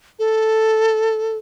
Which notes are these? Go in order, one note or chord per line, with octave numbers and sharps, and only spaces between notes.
A4